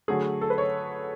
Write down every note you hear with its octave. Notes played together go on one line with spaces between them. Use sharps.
D3 F#3 A3 G#4
A4
B4
C#5